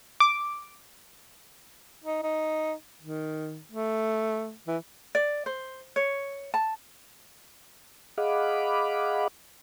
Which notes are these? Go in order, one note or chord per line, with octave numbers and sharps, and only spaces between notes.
D6
D#4
D#4
D#3
A3
E3
D5
C5
C#5
A5
G#4 D#5 F5 F#5 B5 D6